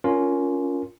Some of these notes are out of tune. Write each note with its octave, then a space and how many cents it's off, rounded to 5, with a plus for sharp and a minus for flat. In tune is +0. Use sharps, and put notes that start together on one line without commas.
C#4 +15 F4 +0 A#4 +0